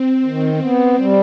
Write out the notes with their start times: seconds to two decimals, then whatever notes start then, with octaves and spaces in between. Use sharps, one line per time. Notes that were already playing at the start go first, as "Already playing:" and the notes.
Already playing: C4
0.26 D#3
0.62 B3
1.00 G3